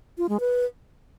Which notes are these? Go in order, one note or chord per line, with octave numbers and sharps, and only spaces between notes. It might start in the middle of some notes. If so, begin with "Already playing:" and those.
F4
G#3
B4